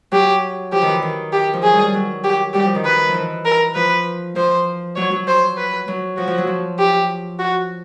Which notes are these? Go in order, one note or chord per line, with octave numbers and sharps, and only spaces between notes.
F#3 G4
F3 G4
D#3
E3
D#3
G4
F3
F#3 G#4
G3
G3
F#3
G4
G3 G4
F3
D#3
B4
F3
E3
A#4
F3 B4
F3 C5
F#3 C#5
F#3
C5
B4
F#3
F3 F#4
F3
F#3
F3
G4
F#4